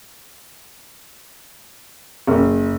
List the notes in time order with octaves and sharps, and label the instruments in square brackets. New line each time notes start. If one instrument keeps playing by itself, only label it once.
[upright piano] F#1